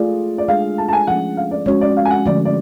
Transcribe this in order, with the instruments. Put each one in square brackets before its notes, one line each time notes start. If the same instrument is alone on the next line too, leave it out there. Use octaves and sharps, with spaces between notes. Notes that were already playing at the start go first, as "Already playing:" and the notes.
Already playing: [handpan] A3 F4 G#4 [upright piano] D5
[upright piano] D5
[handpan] G#3 D4 G#4 [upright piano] F5
[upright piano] A5
A5
G#5
[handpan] F3 A3 C#4 [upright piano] F#5
[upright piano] F5
D5
[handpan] G#3 C#4 F#4 [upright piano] C#5
[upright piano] D5
F5
G#5
F#5
[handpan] D3 F3 A3 [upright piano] D5
[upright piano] D5